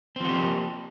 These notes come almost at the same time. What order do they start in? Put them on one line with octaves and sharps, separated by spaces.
C4 F3 F#4 G4 A#3